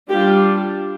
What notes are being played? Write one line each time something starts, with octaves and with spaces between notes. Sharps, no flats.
G3 D4 F4 G4